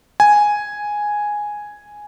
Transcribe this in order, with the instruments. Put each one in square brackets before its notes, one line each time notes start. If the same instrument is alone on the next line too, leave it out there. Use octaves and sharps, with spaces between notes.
[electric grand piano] G#5